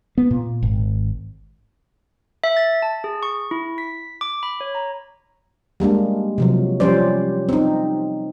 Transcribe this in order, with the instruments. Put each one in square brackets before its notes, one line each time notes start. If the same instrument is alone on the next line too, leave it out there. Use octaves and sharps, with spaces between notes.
[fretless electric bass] B3
A#2
G#1
[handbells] E5
A6
A5
G#4
C#6
E4
B6
D6
B5
C#5
A#5
[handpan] G3 G#3 A#3 D4
C3 F3 F#3
F3 G3 C#4 C5 D5
C4 D#4